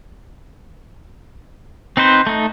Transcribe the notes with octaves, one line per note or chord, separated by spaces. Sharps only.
C4 D#4 B4 C5
A3 D#4